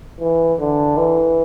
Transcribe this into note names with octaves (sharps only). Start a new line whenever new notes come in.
E3
D3
E3